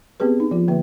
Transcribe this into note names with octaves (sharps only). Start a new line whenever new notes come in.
B3 C4 G4 G#4 B4
D#4
F3 F4
D3 A#3 B4 E5